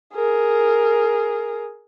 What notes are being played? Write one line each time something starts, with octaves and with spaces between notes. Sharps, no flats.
G#4 A#4